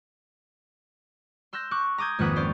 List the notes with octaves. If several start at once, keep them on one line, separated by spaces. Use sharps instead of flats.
C6 E6 F#6 G6 A#6
C#6 D6 F#6
A#5 D6 D#6 G6 G#6
G#1 F2 A#3 B4 F#5 D#6
C#4 C5 D5 F5